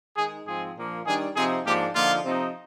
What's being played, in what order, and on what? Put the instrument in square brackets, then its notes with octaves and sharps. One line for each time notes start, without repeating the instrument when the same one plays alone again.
[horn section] D#3 G#3 D#4 G#4
G#2 F3 G#3 C4 G#4
A#2 F3 A#3 D4
D#3 G3 D4 G#4
C3 F3 C4 D#4 G#4
G#2 F3 A#3 D4 G4
D3 F3 A#3 D#4 F4
C3 F3 C4 D#4